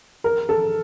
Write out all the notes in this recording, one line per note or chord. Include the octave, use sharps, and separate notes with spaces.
A#4
A4